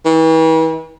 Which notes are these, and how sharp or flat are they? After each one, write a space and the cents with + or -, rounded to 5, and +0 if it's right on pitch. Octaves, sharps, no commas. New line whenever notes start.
E3 -40